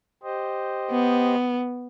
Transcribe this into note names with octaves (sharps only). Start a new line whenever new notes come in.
G4 C5 D#5
B3